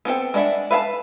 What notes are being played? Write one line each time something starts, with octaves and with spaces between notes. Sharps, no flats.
B3 C4 A4 G5
G#3 D4 D5 E5 F#5
B4 E5 F5 G5 A5